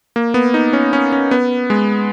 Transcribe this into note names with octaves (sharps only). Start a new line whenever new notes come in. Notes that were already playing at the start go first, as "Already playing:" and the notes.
A#3
B3
D#4
C#4
C#4
C#4
B3
G#3